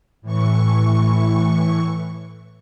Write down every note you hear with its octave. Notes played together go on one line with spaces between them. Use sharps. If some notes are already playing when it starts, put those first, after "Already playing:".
A2 E3 C#6